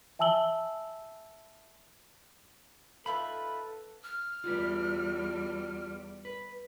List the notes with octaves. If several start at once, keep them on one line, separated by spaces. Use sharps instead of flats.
E5 G#5 A5 E6 F#7 G7
D#4 F4 A4 B4 E5 B5
F6
E2 G3 F4 F#4 B4
B4